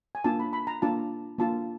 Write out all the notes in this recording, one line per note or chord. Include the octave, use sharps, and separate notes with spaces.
G#5
A#3 D4 F4 A5
B5
B5
A#5
A#3 D4 F4 A5
A#3 D4 F4 A5